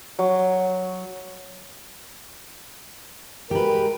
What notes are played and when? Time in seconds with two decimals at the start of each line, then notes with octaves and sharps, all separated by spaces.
0.19 F#3
3.51 G#3 F#4 G4 A#4 B4